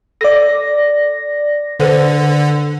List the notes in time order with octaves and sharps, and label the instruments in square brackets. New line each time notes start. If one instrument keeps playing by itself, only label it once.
[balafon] A4 [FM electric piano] D5 A#6
[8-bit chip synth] D3 [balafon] A4 B4 C5